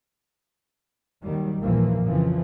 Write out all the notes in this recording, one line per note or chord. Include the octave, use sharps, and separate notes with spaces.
D#2 D#3 F#3 G3
A#1 D#2 A#2 E3 F3 A#3
F2 C#3 E3 F3